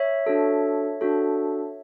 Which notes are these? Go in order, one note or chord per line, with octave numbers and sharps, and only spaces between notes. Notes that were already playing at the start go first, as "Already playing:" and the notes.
Already playing: C#5 E5
D4 F#4 A4
D4 F#4 A4